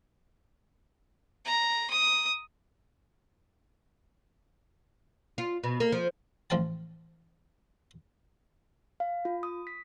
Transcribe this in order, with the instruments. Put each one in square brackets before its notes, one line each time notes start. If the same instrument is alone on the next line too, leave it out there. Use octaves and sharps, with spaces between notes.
[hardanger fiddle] A#5
D#6
[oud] F4
B2
A#3
F3
[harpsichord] A1 F3 C5 F5 G5 A5
[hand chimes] F5
F4
D#6
B6